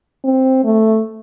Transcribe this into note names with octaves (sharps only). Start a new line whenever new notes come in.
C4
A3